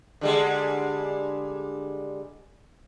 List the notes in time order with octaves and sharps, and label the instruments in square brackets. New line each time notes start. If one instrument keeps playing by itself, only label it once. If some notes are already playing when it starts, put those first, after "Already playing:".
[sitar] D3 G3 G#3